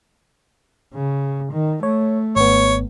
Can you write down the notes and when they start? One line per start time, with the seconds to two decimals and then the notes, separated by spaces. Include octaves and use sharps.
0.94 C#3
1.52 D#3
1.83 A3 C#5
2.36 G#1 B3 C#5